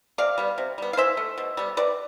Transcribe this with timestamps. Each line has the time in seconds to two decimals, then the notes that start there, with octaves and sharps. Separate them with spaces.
0.18 C3 D5 F5
0.38 G3 B3
0.58 C3
0.78 G3 B3
0.93 F5
0.97 E3 C5 E5
1.17 A3
1.38 B2
1.57 G3 B3
1.77 C3 B4 D5